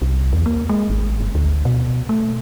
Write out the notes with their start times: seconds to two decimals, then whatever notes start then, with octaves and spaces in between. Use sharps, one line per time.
0.02 C2
0.33 E2
0.46 A#3
0.69 G#3
0.90 G#1
1.21 G1
1.35 D2
1.65 B2
2.09 A3